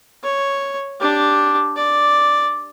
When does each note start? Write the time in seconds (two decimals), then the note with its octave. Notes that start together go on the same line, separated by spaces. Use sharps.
0.24 C#5
1.00 D4 G4
1.76 D5